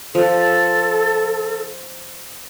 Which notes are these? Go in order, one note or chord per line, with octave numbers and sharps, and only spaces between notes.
F3 A4